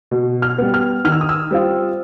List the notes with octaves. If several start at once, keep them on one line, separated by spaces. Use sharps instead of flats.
B2
F6
G3 B3
F6
D#3 F6
E6
D#6
E6
G3 C4 F4